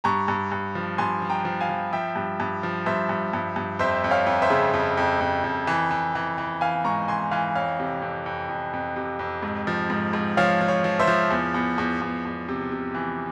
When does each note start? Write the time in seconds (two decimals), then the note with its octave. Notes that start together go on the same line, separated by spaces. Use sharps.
0.04 G2 A#5 C#6
0.28 G2
0.52 G2
0.75 F3
0.98 G2 G#5 C6
1.22 F3
1.29 G5 A#5
1.45 F3
1.61 F5 G#5
1.69 F3
1.93 F3 E5 G5
2.16 G2
2.40 G2
2.63 F3
2.86 G2 C5 E5
3.09 G2
3.33 G2
3.56 G2
3.79 F2 C5 E5
4.04 F2
4.11 C#5 F5
4.26 F2
4.42 C5 E5
4.50 C#3
4.73 F2
4.97 F2
5.21 F2
5.44 F2
5.67 E3
5.91 E3
6.15 E3
6.38 E3
6.61 E3 F5 G#5
6.84 G#2 A#5 C#6
7.08 E3 G#5 C6
7.31 E3 F5 G#5
7.55 F2 C#5 F5
7.79 C3
8.02 F2
8.26 F2
8.49 F2
8.73 F2
8.96 C3
9.19 F2
9.43 G#2
9.67 F3
9.90 G#2
10.13 G#2
10.37 F3 C#5 F5
10.61 F3
10.68 C#5
10.84 F3
10.99 C5 E5
11.07 F3
11.30 E2
11.54 E2
11.78 E2
12.01 E2
12.25 E2
12.49 C3
12.72 C3
12.95 E3